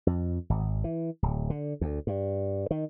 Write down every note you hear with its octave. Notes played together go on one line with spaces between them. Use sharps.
F2
G#1
E3
D1
D3
D2
G2
D#3